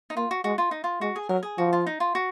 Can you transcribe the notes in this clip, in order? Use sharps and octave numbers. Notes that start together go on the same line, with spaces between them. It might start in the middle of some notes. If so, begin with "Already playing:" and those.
D#4
A#3 F4
F#4
G#3 F#4
F4
D#4
F4
G#3 F#4
G#4
F#3 A#4
G#4
F3 F#4
F4
D#4
F4
F#4